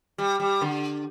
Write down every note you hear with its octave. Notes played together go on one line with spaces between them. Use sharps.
G3
G3
D3